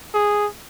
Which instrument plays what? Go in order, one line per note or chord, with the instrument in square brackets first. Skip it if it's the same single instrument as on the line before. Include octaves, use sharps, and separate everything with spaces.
[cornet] G#4